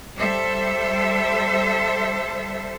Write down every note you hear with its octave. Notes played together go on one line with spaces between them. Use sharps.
G3 A4 C5 E5